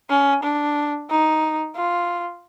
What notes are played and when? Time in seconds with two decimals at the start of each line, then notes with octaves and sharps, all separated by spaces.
0.10 C#4
0.43 D4
1.10 D#4
1.76 F4